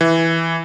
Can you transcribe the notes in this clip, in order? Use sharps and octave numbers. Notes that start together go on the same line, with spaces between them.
E3